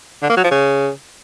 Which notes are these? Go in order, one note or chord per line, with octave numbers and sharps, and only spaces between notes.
D3
A#3
F#3
F3
C#3